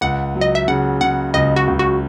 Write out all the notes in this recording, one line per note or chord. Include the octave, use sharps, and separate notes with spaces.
C#2 F#5
F#3
D#5
E5
C#3 F#5
C#3 F#5
C#2 D#5
F#4
C#2
F#4